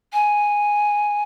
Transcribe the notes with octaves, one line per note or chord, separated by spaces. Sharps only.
G#5